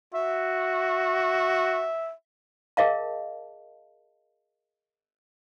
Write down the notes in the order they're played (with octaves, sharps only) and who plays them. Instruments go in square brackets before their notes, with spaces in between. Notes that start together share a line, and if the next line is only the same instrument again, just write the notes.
[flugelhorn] F#4 [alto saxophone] E5
[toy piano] G#4 A#4 D#5 F5 A5